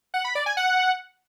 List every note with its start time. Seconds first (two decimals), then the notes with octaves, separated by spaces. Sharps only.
0.14 F#5
0.25 B5
0.35 D5
0.46 G#5
0.57 F#5